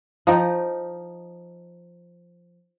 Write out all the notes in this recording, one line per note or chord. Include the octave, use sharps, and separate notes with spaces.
F3 D#4 G5